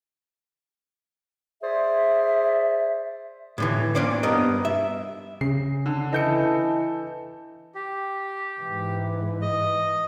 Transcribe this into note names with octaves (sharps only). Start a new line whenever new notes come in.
G#4 C5 D5 E5
A2 D3 E3
A#3 C#4 D4 C5 D5
G2 B3 A#4 D#5
E5
C#3 C#4 C7
D3
E3 A4 D#5 A5 G6 C#7
G4
G#2 E3
D#5